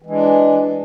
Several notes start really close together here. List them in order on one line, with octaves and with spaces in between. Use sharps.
E3 G#3 D4